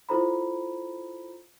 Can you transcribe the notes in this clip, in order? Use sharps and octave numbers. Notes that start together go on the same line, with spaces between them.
E4 F4 A4 C5 A#5 B5